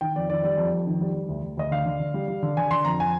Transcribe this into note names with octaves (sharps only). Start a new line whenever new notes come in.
D#3 G5
F2 D5
D#3 D5
G3 D5
F2
F2
D#3
G3
G3
D2
D2
D2 D#5
D3 F5
D3
D3
G3
G3
D3
D3 G#5
D3 C6
F2 A#5
G#5